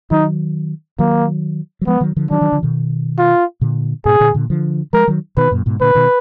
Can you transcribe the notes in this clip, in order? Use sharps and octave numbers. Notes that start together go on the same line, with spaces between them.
D#3 F#3 D#4
D#3 F#3 A#3
F#3
F3 G#3 B3
D#3 F#3
D3 F3
D#3 F#3 D4
D#3 F#3
D3 F3
B2 D#3
F4
A#2 D3
G#2 B2 G#4
A#2 D3
A#2 D3
D3 F3
F3 G#3 A#4
D#3 F#3
B2 D#3 B4
F#2 A#2
G#2 B2
A#2 D3 B4
B2 D#3